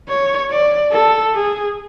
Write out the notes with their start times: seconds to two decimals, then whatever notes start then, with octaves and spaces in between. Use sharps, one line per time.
0.09 C#5
0.51 D5
0.92 A4
1.34 G#4